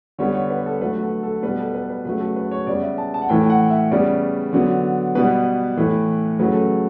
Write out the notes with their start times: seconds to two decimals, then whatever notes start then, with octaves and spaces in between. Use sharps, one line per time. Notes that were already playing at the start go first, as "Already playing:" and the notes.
0.18 D3 G3 B3 C#5
0.35 C#5
0.50 B4
0.66 A4
0.81 D3 F#3 A3 B4
1.02 A4
1.23 A4
1.43 B2 G3 B3 B4
1.59 A4
1.74 B4
1.89 B4
2.05 C#3 F#3 A3 B4
2.20 A4
2.36 B4
2.51 C#5
2.67 C#3 G3 B3 D5
2.82 E5
2.98 A5
3.14 A5
3.22 F#5
3.29 A2 E3 A3 G5
3.50 F#5
3.70 E5
3.91 C#3 G3 B3 D5
4.53 D3 F#3 B3
5.15 B2 G3 B3 B4
5.77 A2 E3 A3
6.39 C#3 F#3 A3 B4
6.53 A4